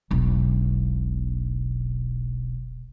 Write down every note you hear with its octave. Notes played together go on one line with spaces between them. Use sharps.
E1 B1